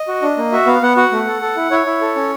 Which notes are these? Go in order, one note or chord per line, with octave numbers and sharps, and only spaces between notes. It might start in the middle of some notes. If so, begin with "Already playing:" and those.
Already playing: D#5
F#4
D4
A#3
F#4 E5
B3 F5
B3 F#5
F#4 F#5
A3
A4
A4
E4
E4 C#5
E4
A4
C#4